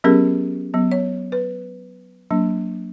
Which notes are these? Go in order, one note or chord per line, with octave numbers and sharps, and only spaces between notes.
F#3 B3 C#4 G4 G#4 A#4
F#3 B3
C#5
B4
F#3 A#3 D4